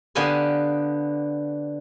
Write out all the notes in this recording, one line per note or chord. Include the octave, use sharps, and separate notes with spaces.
D3 B3 G4 F5 G#5 C6